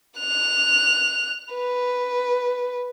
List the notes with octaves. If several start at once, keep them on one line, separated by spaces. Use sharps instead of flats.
F#6 F7
B4